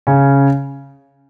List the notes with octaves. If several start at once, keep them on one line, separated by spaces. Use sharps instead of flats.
C#3 C#4